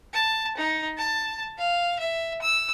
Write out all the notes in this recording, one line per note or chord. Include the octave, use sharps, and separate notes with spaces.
A5
D#4
A5
F5
E5
E6